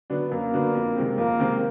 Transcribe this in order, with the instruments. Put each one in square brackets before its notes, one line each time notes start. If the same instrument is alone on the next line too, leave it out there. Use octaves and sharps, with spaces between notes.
[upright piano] D3 F#3 B3 D4
[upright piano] F#2 [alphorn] A#3
[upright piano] D3 F#3 B3 D4
F2
C3 D#3 G#3 C4
[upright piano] F2 [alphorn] A#3
[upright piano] C3 D#3 G#3 C4